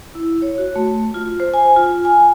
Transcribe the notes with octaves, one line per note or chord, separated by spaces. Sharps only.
E4
C#5
F#4
A3
F4
C5
G#5
F4
G#5